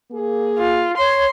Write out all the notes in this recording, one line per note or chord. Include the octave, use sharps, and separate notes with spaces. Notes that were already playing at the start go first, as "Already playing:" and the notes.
A#3 G#4
F4
C#5 C6